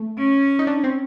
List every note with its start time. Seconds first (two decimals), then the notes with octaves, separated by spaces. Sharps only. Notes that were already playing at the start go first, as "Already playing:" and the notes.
Already playing: A3
0.18 C#4
0.59 D#4
0.67 D4
0.84 C4